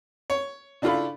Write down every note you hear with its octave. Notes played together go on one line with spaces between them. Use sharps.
C#5
C#3 D4 E4 F4 A4 B5